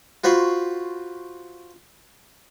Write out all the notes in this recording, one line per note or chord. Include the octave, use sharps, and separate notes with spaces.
F4 F#4 C5 B5 C#6